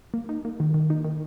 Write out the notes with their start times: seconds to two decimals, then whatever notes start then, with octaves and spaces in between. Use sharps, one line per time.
0.14 A#3
0.29 D#4
0.45 A#3
0.60 D#3
0.74 D#3
0.90 D#4
1.05 D#3